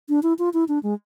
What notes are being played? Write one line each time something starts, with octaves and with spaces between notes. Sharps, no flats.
D4
E4
F4
E4
D4
G#3